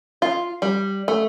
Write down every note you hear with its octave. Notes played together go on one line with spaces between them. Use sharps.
F4
G3
A3